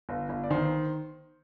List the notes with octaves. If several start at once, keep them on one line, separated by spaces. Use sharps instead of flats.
G1
G1
D5
D#3 C5